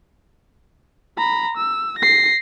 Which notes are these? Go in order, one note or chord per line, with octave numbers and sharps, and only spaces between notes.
A#5 B5
E6
A#6 C7